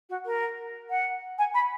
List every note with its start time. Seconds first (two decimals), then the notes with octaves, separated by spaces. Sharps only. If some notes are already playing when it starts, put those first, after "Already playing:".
0.09 F#4
0.25 A#4
0.90 F#5
1.38 G#5
1.54 B5